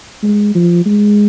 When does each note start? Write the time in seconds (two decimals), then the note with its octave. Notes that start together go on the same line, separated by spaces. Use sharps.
0.23 G#3
0.55 F3
0.86 G#3